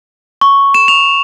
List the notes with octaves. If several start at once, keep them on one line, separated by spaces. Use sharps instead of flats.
C#6
E7
F7